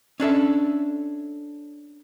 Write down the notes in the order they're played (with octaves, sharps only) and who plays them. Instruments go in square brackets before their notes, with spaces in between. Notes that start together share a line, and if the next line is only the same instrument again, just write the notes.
[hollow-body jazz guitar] C#4 D4 A4 E5